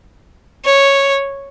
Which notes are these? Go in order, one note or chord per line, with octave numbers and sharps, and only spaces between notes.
C#5